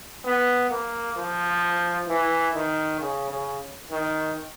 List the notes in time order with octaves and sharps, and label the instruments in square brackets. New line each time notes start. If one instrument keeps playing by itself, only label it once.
[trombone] B3
A#3
F3
E3
D#3
C#3
C#3
D#3